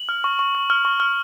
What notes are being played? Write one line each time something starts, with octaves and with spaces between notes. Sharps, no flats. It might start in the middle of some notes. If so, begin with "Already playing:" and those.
Already playing: F#7
F6
C#6
C#6
C#6
F6
C#6
F6